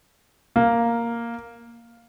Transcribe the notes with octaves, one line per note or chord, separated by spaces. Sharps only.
A#3